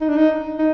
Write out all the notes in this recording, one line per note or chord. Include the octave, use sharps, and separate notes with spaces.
D#4
D4
D#4
D#4